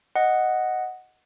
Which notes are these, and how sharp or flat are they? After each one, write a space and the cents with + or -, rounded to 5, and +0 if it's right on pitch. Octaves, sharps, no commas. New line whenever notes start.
D#5 +0 F#5 +0